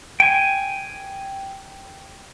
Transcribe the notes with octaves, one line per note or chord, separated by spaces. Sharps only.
G5 G#5